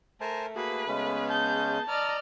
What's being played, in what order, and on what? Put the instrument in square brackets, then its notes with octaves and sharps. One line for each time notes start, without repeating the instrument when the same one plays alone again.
[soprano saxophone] A3 [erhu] A#4 [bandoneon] C5 G#5 A5
[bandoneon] A#3 G#4 [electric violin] F#4 [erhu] B4
[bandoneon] C#3 G#3 C#4 [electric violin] B3 G#4
[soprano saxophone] A5 [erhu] G6
[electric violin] D5 D#5 [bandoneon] A#5 [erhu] F6